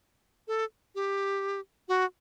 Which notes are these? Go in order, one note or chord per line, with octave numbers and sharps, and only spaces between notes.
A4
G4
F#4